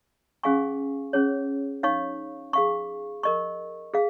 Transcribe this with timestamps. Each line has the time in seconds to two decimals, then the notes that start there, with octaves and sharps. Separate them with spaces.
0.43 C#4 G#4 F5 G#5 C#6
1.13 C#4 G#4 C#5
1.83 D#4 C#5 F5 C#6
2.53 G#4 F5 C#6
3.23 A#4 D#5 C#6
3.94 G#4 F5